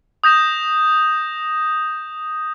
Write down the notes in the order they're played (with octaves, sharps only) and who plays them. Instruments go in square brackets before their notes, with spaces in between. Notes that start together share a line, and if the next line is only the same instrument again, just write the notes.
[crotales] D#6 G6 A#6 E7